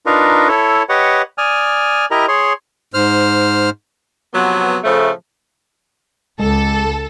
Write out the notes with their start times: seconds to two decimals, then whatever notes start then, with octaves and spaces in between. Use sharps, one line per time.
0.06 D4 D#4 F4 A#4 B4
0.48 E4 A4 C#5
0.89 G4 B4 C#5 D#5 F#5
1.38 D5 G#5 D#6 F6
2.11 E4 G4 A#4 D#5 A#5
2.28 G#4 C#5 C6
2.94 G#2 C5 F6
4.34 C3 F3 F#3 B3
4.84 A2 C#3 F3 A3
6.39 C#2 G#3 A4